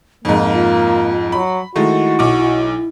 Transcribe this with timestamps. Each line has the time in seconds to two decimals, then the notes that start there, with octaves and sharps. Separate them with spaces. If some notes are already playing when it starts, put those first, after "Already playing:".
0.25 F2 G#2 A#3 D#4
0.53 F4
1.32 F#3 B5
1.76 D#3 G#3 A3 E4 F#4
2.19 B1 D6